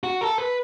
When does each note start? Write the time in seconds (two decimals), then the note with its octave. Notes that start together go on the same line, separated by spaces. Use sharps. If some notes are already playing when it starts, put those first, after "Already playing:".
0.04 F#4
0.21 A4
0.38 B4